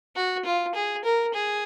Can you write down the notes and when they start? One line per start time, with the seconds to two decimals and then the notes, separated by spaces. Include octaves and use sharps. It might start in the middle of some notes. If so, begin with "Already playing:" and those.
0.16 F#4
0.45 F4
0.75 G#4
1.05 A#4
1.34 G#4